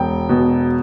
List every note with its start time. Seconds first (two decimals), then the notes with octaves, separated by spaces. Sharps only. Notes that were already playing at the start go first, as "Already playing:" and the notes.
Already playing: E1 G5
0.29 B2